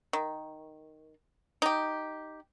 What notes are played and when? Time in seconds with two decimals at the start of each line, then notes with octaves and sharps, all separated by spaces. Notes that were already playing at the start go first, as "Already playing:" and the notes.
0.13 D#3
1.62 D#4 G4